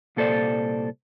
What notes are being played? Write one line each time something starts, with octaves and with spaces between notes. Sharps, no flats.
C2 A#2 A4 C5 D5